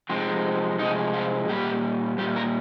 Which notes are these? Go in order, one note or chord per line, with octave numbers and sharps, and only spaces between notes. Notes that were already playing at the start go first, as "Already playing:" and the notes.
C3 F3 G#3 C4
C3 F3 G#3 D#4
F4
A#2 G3 G4
A#2 G3 G4
A#4